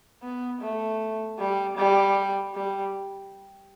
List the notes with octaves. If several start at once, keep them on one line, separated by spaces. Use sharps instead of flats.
B3
A3
G3
G3
G3